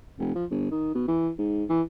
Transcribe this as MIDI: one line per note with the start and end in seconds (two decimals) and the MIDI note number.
0.19 0.31 29
0.35 0.45 53
0.50 0.66 31
0.71 0.93 51
0.95 1.06 47
1.08 1.31 52
1.39 1.64 44
1.69 1.82 52